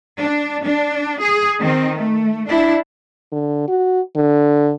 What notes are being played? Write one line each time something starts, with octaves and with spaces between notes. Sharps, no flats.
D4
D4
G#4
D#3 C4
A3
D4 E4
D3
F#4
D3